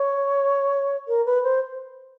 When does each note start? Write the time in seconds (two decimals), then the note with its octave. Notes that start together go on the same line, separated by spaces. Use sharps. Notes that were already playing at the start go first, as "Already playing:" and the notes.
Already playing: C#5
1.08 A#4
1.26 B4
1.43 C5